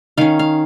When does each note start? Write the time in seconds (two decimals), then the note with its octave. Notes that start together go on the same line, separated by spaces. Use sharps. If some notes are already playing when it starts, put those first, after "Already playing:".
0.18 D#3 C#4 F5
0.39 F5